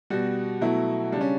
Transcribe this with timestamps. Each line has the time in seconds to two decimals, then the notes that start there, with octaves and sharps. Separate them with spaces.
0.10 B2 G3 F#4
0.61 B2 F#3 A3 E4
1.12 C#3 G3 D4
1.21 C#4